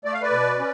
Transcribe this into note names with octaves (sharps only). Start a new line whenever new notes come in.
A3 D5
F5
B4 D5
B2
C#4